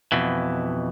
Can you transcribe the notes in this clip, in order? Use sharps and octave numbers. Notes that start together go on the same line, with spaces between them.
F2 B2 E3